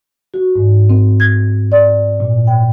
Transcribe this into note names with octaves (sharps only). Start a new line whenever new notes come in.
F#4
G#2
C4
G#6
D5
A#2
G5